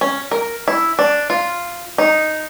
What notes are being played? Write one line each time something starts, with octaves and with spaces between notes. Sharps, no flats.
C#4
A#4
E4
D4
F4
D#4